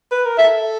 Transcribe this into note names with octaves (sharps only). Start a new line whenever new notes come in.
B4
A#4
A4 E5